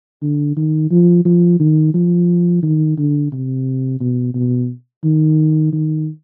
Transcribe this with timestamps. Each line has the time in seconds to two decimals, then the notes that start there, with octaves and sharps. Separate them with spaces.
0.22 D3
0.57 D#3
0.91 F3
1.25 F3
1.60 D#3
1.94 F3
2.63 D#3
2.98 D3
3.32 C3
4.00 B2
4.34 B2
5.04 D#3
5.73 D#3